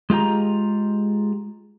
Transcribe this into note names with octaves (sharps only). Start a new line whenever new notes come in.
G#3 F4 G4 A#5